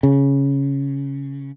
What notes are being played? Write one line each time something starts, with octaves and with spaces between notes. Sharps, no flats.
C#3